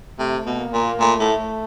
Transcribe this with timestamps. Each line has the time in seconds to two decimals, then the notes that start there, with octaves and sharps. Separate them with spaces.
0.19 C3 A3
0.46 B2
0.59 A#3
0.72 A#2
1.00 A#2 A3
1.20 A2